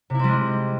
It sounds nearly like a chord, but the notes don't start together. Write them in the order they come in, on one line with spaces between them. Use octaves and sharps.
C3 E4 C4 G3 G#3